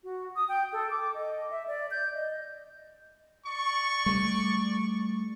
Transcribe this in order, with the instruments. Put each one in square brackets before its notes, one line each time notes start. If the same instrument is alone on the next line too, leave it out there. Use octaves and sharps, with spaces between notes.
[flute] F#4
D#6
G5
A4
D6
D#5
E5
D5
G6
D#5
[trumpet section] D5 C#6
[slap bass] G3 A3